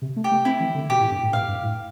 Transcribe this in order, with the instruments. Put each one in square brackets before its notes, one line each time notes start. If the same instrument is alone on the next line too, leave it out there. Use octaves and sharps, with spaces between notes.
[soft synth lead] C3
A3
[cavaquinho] G4
[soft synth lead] A3
[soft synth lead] C4 [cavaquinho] E4
[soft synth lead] E3
D3
[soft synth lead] B2 [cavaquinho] G4
[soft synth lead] A2
G2
A2
[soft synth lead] A2 [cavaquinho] F5
[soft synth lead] G2
A2